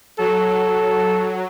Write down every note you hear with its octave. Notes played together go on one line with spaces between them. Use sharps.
F#3 A4